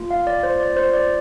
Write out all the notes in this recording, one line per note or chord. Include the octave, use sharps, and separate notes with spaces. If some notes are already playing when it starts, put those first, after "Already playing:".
Already playing: A#3 F4
F5
D5
C5
D5
C5
D5